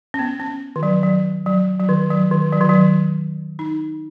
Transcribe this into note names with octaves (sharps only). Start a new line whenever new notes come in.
C#4
B3
C#4
D#3
F#3
F#3
F#3
F#3
D#3
F#3
D#3
F#3
D#3
F#3
D#4